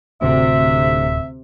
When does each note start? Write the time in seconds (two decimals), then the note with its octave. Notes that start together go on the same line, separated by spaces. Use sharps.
0.22 D1 D2 C3 E5